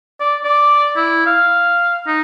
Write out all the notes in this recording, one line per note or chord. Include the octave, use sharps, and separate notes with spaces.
D5
D5
E4
F5
D#4